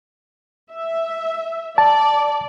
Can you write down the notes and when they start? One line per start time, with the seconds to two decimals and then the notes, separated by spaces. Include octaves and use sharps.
0.72 E5
1.78 D5 A5